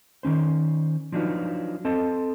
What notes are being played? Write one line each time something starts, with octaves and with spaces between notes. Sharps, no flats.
D#3 E3 C#4 C5
F3 F#3 D4 D#4 F4 B4
C4 A4 D#5 A5